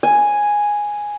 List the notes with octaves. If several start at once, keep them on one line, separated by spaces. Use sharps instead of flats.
G#5